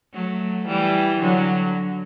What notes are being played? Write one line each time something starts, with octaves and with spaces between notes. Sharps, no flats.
F#3 A3
E3 G3
D3 F#3